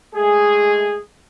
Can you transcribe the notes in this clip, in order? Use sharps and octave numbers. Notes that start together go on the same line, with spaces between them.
G#3 A3 G#4